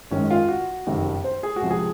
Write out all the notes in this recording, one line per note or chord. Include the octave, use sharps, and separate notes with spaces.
G#1 F#2 D#3 G#3 C#4
F4
F#4
F#1 F2 C3 D#3
C5
G#4
F#4
C#2 C3 F3
G#4